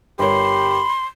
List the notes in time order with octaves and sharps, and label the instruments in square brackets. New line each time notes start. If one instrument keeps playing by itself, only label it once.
[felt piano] G1 A#4 C#5 [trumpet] G4 [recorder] B5 [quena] C6